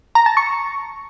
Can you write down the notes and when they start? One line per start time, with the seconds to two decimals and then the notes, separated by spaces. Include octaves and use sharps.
0.15 A#5
0.26 A5
0.37 C#6